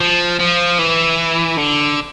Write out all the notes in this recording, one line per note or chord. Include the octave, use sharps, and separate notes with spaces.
F3
F3
E3
D3